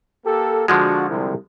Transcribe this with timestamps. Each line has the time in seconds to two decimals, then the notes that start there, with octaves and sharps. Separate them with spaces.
0.25 A#3 G4 A4
0.68 D3 F3 G#3 D4 F4 F#4
1.09 C2